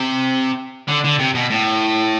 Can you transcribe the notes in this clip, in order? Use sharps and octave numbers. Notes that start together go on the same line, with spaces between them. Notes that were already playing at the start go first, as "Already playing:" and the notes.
Already playing: C3
D3
D3
C3
B2
A2